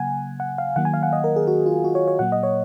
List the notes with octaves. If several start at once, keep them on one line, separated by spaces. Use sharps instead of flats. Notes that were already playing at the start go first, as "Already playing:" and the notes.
Already playing: C#3 F#3 A#3 F#5 G#5
F#5
F5
D#3 F#3 A#3 F#5
G#5
F5
F#5
D#5
A#4
G#4
F#4
F4
F#4
C#5
C#5
A#2 F#3 A#3 F#5
D#5
C#5